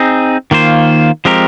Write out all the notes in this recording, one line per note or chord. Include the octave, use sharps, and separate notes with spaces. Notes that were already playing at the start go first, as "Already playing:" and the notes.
Already playing: C4 D#4 G#4
D#3 A#3 F4 C5
F3 G#3 C4 G4 A#4